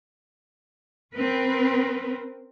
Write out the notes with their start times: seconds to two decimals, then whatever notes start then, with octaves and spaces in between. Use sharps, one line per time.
1.14 C4 C#4 A#4 B4